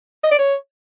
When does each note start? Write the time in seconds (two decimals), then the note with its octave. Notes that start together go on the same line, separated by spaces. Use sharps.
0.24 D#5
0.31 D5
0.38 C#5